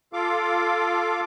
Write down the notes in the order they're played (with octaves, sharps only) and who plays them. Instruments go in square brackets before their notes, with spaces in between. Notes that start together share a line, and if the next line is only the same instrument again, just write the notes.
[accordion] F4 A4 F5 D6